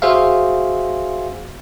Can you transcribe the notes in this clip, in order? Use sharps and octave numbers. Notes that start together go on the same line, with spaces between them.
F#4 G#4 C5 E5 F5